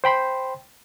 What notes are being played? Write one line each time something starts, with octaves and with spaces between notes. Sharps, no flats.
C5 G5 B5 C6